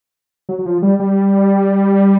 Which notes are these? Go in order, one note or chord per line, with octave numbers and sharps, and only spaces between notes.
F#3
F#3
F3
G3
G3